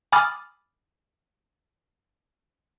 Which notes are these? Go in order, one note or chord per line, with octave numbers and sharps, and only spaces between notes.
G#5 B5 D6 D#6 F6 A6